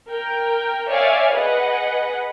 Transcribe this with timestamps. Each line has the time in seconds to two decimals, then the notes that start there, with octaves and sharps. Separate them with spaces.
0.12 A#4 G5
0.89 C#5 D5 E5 F5 G#5
1.35 G#4 B4 D#5 F#5